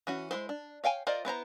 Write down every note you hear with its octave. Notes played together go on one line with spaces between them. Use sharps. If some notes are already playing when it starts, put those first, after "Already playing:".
E3 C#4 F#4
G#3 C4 E4 C5
D4
C#5 F5 G5 G#5
F4 A#4 C5 D5 D#5
B3 E4 C5 A#5